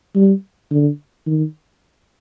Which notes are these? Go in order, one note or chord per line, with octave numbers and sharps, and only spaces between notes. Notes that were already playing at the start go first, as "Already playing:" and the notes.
G3
D3
D#3